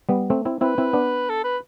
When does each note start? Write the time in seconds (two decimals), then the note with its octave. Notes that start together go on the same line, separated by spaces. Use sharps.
0.09 G3 B3
0.30 A3 C4
0.45 C4 E4
0.61 C4 E4 B4
0.78 C4 E4
0.93 B3 D4
1.29 A4
1.44 B4